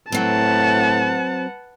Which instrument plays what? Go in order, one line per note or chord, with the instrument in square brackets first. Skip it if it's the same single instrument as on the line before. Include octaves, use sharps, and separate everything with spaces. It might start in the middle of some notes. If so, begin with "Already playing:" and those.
[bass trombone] A2 [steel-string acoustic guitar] F#3 C4 [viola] B4 F#5 [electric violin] A5